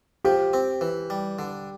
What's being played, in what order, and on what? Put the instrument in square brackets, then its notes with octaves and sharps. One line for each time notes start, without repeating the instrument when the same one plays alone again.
[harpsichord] F3 [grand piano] G4
[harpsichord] C4
E3
G3
D3